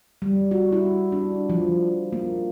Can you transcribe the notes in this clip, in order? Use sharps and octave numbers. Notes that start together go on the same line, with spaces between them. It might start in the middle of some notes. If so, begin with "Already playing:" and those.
G3
F#4
E4
D4
F3
A#3